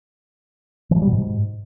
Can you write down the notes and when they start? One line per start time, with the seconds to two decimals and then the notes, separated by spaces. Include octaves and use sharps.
0.91 E3
0.96 F#3
1.02 G3
1.07 B2
1.12 G#2